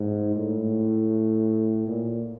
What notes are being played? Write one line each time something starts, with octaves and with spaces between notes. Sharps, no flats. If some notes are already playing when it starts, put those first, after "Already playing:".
Already playing: G#2
A2
A#2